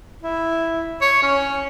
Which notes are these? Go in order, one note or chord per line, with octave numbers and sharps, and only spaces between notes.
E4
C#5
C#4